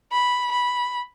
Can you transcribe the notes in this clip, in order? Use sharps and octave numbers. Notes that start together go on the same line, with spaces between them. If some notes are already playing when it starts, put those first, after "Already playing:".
B5
B5